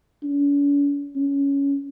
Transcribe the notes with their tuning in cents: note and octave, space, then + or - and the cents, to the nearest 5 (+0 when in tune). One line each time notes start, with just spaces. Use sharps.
C#4 +45
C#4 +10